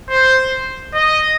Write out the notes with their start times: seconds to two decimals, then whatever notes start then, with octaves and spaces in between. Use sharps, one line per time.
0.10 C5
0.94 D#5